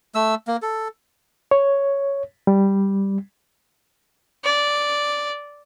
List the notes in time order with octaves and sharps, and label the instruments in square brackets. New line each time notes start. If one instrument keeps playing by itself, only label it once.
[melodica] A3 E6
A#3
A4
[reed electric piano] C#5
G3
[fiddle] D5